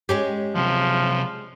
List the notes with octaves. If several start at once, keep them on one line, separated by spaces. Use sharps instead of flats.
G#3 C#4 G4
C3 F3 F#3